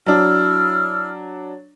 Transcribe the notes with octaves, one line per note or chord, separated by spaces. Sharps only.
F#3 D4 E4 E6 F6